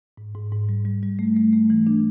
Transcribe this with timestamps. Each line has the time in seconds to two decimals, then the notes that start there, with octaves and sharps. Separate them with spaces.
0.18 G#2
0.35 G#2
0.52 G#2
0.69 G3
0.85 G3
1.03 G3
1.19 A3
1.37 A3
1.53 A3
1.70 E3
1.87 D4